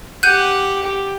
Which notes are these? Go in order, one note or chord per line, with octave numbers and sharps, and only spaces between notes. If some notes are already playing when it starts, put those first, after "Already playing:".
G4 F#5 F#6 G6 D#7
G4